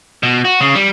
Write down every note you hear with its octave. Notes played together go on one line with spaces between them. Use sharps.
B2
F#4
C#3
G3